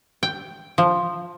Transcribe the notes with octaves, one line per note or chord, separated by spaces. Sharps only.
G5
F3